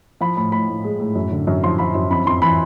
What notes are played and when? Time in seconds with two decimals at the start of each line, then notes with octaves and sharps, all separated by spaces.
0.21 F3 B5
0.37 A2 B5
0.52 A2 B5
0.69 A2
0.84 G#3
1.00 A2
1.15 F#2
1.31 D3
1.47 F#2
1.63 F3 C6
1.78 F3 B5
1.95 F#2
2.11 F2 B5
2.26 F2 C6
2.42 E3 B5